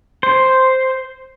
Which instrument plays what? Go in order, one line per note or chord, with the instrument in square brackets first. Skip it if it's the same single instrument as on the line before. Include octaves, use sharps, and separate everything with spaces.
[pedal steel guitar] C5